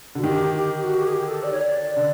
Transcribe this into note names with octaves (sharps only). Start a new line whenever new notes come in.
D3 F#4
D#3 G4
G4
F#4
G4
G#4
G4
A4
D5
C#5
D5
D3